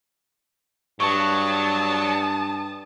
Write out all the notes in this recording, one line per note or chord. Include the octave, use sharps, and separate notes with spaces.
G2 F#3 A5 C#6 D#6